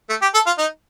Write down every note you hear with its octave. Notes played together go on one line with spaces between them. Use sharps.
A3
G4
A4
F4
D#4